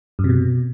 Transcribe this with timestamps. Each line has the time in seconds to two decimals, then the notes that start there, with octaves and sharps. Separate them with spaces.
0.19 F#2
0.24 C3
0.29 B2